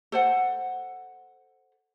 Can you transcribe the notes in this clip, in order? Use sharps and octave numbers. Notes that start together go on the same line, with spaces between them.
A4 C5 F#5